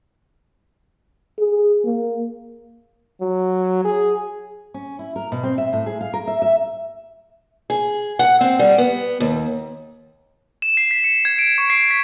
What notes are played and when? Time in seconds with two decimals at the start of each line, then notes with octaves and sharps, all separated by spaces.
1.39 G#4
1.84 A#3
3.21 F#3
3.85 G#4
4.74 C#4
4.99 E4
5.16 A#4
5.32 B2
5.43 C4
5.58 E5
5.73 A2
5.86 G#4
6.01 F5
6.14 A#4
6.27 E5
6.42 E5
7.70 G#4
8.19 F#5
8.41 C4
8.59 G3
8.78 B3
9.20 D#2
10.62 E7
10.77 C7
10.91 B6
11.04 C#7
11.25 G#6
11.39 D7
11.58 C#6
11.70 C7
11.91 B6